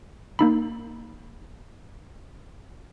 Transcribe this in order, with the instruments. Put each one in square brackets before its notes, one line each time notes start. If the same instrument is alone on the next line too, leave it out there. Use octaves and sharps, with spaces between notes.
[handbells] A#3 D#4 B5